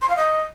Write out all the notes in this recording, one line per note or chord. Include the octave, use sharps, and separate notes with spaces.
C6
F5
D#5